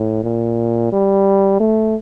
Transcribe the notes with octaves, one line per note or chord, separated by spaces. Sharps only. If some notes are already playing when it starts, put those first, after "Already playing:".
Already playing: A2
A#2
G3
A3